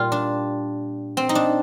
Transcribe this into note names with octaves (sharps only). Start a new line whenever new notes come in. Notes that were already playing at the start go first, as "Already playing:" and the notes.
Already playing: A#2 G3 F4 G4
D4
C4
D#4
D4